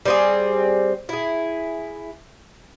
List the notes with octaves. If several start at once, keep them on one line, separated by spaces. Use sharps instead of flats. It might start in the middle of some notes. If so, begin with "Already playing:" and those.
G3 C4 G#4
E4 G#4